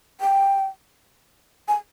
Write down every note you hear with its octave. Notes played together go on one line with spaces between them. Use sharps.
G5
G#5